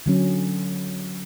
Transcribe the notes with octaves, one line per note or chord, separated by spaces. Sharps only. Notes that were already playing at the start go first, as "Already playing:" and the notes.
D3 F#3 C#4